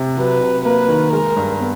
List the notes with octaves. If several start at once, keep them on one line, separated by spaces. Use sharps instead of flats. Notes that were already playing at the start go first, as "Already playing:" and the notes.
Already playing: C3
F#3 B4
C3
A#3 B4
D#3
G#3 A#4
G2
B3